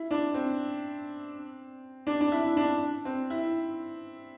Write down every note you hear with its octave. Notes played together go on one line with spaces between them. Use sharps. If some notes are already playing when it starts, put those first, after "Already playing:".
Already playing: E4
D4
C4
D4
D4
E4
D4
C4
E4